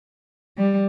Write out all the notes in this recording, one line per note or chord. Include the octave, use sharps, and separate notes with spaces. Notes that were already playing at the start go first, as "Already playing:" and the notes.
G3